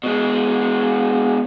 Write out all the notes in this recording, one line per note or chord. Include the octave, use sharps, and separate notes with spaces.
B2 G#3